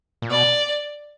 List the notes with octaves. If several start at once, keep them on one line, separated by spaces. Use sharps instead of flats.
A#2
B2 D5